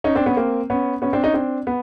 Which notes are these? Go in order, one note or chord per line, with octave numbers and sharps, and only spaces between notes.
C#4 D#4
C4 D4
B3 C#4
A#3 C4
B3 C#4
B3 C#4
C4 D4
C#4 D#4
C4 D4
B3